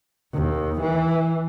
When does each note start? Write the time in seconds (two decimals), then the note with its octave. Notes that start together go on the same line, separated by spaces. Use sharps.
0.33 D#2
0.82 E3